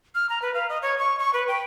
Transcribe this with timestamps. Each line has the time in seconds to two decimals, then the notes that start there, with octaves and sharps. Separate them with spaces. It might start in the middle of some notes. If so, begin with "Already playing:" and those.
0.15 F6
0.29 A#5
0.42 B4
0.54 F5
0.69 D#5
0.82 C#5
0.99 C#6
1.19 C#6
1.33 B4
1.48 G5